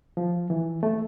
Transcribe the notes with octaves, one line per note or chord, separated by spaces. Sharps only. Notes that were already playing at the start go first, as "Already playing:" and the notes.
F3
E3
A3